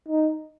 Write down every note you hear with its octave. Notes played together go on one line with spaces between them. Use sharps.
D#4